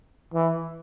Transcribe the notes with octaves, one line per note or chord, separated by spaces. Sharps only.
E3